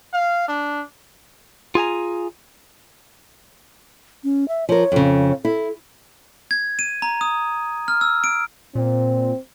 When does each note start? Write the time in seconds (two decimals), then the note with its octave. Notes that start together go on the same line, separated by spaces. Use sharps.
0.13 F5
0.48 D4
1.75 F4 G#4 G#5 A#5
4.24 C#4
4.48 E5
4.69 F3 A#4 C#5
4.92 F2 C#3
5.45 E4 A4
6.51 G#6
6.79 D#7
7.02 A#5
7.21 D#6
7.88 F6
8.01 E6
8.24 D7
8.75 A#2 C4